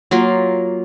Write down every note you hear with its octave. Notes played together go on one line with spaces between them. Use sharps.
F#3 A#3 F4